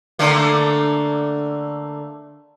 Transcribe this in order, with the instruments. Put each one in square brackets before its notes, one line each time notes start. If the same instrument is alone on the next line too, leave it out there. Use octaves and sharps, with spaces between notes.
[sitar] D3 A3 A#3